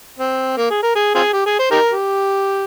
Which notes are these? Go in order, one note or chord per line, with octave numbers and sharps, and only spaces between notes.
C4
A#3
G#4
A#4
G#4
C4 F4 G#4
G4
G#4
C5
D#4 G4 A#4
G4